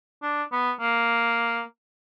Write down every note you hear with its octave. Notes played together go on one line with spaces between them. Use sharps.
D4
B3
A#3